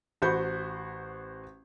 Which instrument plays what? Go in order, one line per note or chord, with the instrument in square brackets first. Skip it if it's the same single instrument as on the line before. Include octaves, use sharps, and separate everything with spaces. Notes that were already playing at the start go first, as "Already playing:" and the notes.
[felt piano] A1 F#4 C5 B5 G6 C#7